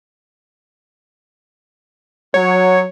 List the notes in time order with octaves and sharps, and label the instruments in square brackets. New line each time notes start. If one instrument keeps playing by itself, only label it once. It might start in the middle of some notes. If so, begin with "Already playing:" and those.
[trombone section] F#3 [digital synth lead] C#5